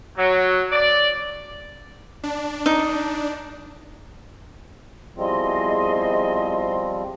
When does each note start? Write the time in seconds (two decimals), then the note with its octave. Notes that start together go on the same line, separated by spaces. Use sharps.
0.17 F#3
0.72 D5
2.23 D4
2.66 D#4
5.17 B2 F3 G3 C4 E4 G#4 D#5 C6